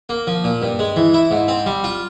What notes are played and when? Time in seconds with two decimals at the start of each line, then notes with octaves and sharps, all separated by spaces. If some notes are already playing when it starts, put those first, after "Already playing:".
0.09 A#3
0.27 F3
0.44 A#2
0.62 G2
0.79 G#3
0.96 E3
1.14 E4
1.31 G#2
1.48 C4
1.66 G3
1.84 F4